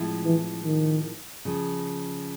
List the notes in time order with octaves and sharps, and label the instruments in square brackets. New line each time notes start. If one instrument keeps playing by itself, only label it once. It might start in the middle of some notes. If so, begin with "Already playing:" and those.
Already playing: [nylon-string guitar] A2 F3 G#3 C4 E4
[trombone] E3
D#3
[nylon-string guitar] C#3 F3